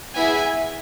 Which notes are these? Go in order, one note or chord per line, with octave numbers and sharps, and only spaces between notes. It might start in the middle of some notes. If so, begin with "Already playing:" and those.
B3 E4 G#4 E5 G#5